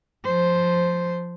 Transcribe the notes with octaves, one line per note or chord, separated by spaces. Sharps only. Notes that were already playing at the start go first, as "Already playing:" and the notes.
F3 C5